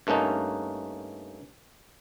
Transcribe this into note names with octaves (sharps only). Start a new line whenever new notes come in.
G2 A3 A#3 C#4 D#4